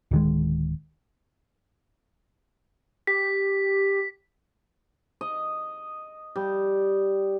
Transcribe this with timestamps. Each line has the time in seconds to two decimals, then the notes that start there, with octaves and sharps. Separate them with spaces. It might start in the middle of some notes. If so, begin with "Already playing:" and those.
0.11 D1 D#3 G#3
3.07 G4 B6
5.21 D#5
6.36 G3